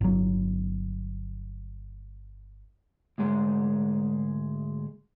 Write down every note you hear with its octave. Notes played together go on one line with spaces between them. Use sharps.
G1 F#3
D2 G#2 G#3